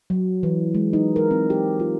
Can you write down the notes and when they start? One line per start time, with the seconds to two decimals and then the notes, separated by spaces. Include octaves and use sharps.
0.10 F#3
0.43 E3
0.75 G#3
0.93 D#4
1.16 A#4
1.31 C4
1.50 G4
1.80 F4